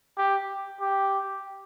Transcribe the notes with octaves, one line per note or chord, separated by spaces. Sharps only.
G4
G4